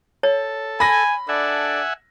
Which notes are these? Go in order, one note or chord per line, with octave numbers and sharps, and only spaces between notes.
A4 C#5
G#5 B5 A#6
D4 A4 D5 E5 F#5 G#5